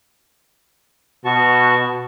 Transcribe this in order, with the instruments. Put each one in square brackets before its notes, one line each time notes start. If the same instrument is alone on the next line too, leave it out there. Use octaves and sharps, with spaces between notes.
[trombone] B2 [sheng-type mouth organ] F#4 A5 C#6